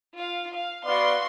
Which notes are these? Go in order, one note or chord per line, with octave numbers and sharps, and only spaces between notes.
F4 F5
F5
B3 F#4 D5 F5 C6